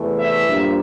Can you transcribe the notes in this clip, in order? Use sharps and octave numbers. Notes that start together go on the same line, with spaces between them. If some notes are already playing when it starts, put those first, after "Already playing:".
Already playing: E2 C3 E3 A3
E5
G2 F3 A#3